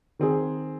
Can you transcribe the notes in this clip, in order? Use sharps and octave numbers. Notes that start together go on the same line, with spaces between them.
D#3 C4 G#4